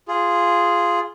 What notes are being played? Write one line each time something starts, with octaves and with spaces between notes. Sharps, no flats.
F4 G#4